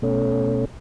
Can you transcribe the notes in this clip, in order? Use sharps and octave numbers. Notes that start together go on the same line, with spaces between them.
B2 A3 C#4